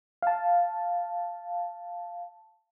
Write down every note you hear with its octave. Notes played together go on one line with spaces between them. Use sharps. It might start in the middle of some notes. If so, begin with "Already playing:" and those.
F5 A5